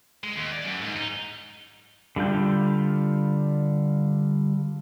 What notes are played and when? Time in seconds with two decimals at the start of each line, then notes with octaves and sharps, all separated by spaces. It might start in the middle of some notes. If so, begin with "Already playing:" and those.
0.23 G#3
0.36 D#2
0.52 D5
0.64 F#2
0.81 G#2
0.96 D#4
2.16 D3 G3 F4 G6